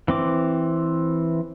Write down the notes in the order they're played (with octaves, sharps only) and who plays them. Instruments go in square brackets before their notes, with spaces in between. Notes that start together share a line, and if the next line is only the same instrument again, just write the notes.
[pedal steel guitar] E3 C4 D6